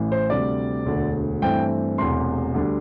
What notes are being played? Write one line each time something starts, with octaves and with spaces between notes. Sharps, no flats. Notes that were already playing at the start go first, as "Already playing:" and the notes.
Already playing: A1 A2 E3
C5
D2 C3 G3 D5
E1 D2 D3
G2 E3 A3 C4 G5
E1 E2 C3 A3 C6
D2 D3 G3 D4